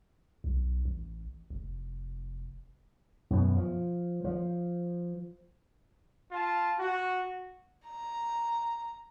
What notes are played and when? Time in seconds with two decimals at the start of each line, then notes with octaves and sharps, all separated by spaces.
0.44 B1
0.85 A1
1.50 F1
3.30 F#2 B2
3.57 F3
4.24 F3
6.31 F4 A5
6.78 F#4
7.86 A#5